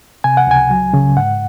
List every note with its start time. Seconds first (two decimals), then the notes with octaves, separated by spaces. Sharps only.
0.24 C3 G#5
0.37 F#5
0.47 C#2 G#5
0.71 F#3
0.93 C#3
1.16 G#2 F#5